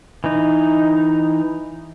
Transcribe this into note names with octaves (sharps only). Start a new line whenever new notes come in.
E3 D#4